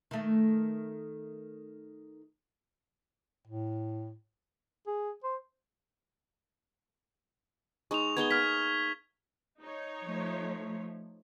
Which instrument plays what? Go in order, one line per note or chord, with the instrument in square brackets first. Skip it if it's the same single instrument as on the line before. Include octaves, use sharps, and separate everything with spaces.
[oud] D#3 A3
[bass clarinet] A2
G#4
C5
[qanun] G#3 D#4 [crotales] C#6 F7
[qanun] B3 D#4 G#4 [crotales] G#6 G7
[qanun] A#3 [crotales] F6 G#6 B6
[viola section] D#4 C#5
[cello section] F3 A3